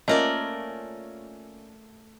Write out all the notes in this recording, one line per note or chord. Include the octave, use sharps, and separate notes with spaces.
A3 A#3 C#4 F4 A#4 D5 D#5